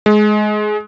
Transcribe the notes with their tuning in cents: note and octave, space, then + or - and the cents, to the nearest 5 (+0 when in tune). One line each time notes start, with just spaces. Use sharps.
G#3 +20